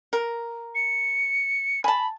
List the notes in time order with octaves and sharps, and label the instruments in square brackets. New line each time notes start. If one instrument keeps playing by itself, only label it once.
[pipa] A#4
[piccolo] C#7
[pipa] G#5 A5 [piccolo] B5